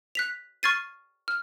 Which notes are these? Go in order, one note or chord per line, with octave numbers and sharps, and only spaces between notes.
F#6 B6 F7
C#6 F6 G#6 A6 C7 D#7
F6